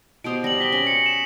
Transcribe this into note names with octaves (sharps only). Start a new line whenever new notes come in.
B2 G4 C5 D#6 D7
G3 A#6 F#7
A#6 B6 G7
C#4
C#7
E7